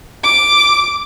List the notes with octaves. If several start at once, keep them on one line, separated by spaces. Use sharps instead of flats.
D6